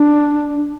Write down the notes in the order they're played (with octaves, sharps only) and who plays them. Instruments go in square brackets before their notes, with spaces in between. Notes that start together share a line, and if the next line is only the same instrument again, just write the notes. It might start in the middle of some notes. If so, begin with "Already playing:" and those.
Already playing: [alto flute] D4